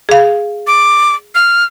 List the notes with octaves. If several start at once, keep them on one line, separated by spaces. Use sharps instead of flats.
G#4 F5
D6
F6